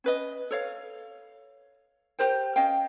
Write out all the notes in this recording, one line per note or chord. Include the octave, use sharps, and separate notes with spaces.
C#4 B4 D#5
A4 C#5 F5
G4 A#4 C5 G5
C#4 D#5 F5 G5